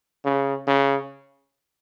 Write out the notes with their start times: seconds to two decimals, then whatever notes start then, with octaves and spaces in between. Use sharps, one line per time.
0.25 C#3
0.67 C#3